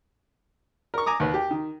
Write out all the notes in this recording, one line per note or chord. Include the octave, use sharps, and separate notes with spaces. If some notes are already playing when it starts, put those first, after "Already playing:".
A#4 C#6
G#5 A#5 D6 D#6
D#2 B4
G4
D#3